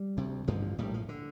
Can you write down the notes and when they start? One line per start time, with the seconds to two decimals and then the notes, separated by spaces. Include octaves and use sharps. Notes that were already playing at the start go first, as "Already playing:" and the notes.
Already playing: G3
0.17 D2 C3
0.47 A1 G2 D3 F3
0.79 A#1 A2 G3
0.94 F3
1.09 D3